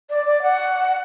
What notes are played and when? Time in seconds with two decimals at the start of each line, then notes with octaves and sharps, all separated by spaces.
0.10 D5
0.26 D5
0.42 F#5